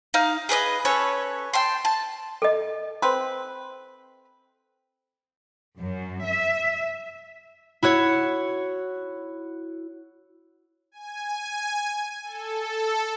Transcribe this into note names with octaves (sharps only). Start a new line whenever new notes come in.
D#4 F5
G#4 B4 D5 D#5
C#4 A4 B4 C#5
G5 A5 C6
A5
A4 D#5
C4 B4
F#2
E5
E4 F#4 C#5
G#5
A4